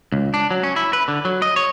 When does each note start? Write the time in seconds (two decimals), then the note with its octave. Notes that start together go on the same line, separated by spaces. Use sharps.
0.12 C#2
0.34 D4
0.51 F#3
0.63 C#4
0.76 E4
0.93 B4
1.08 D3
1.25 F#3
1.42 D#5
1.56 C#5